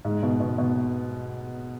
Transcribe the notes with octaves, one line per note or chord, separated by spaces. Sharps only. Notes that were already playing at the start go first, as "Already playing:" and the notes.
G#2
B2
B2
B2